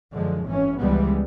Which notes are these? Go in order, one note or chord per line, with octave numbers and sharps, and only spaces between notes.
F#2 D3 F3 G#3
G#1 F#2 E3 C#4
C#2 E3 F3 G3 G#3 B3